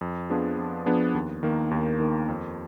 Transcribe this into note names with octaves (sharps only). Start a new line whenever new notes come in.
F2
F3 B3 D4 G#4
F2
F3 B3 D4 G#4
D#2
D#3 A#3
D#2
D#3 A#3
F2